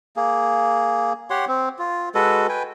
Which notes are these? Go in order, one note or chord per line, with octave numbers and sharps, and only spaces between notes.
A#3 G#4
G4 C#5 F#5 C6
C4
F4
G#3 F#4 A4 B4
B4 G5 G#5